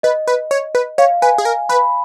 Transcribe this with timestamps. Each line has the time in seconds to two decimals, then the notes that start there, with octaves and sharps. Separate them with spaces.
0.03 B4 D#5
0.28 B4
0.51 C#5
0.75 B4
0.98 C#5 F5
1.22 B4 G#5
1.38 G#4
1.45 A#4
1.69 B4 B5